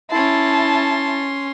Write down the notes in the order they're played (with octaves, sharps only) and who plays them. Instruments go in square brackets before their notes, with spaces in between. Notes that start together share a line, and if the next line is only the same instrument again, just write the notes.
[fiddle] C#4 C6 [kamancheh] E4 A5